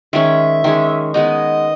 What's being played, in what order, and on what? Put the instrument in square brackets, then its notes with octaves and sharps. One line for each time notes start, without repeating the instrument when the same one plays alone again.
[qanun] D#3 G#3 C#4 [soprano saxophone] E5
[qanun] D#3 G#3 C#4
[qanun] G#3 B3 D#4 [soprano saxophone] D#5